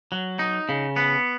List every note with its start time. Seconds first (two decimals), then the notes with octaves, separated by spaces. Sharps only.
0.12 F#3
0.39 D#4
0.69 C#3
0.96 B3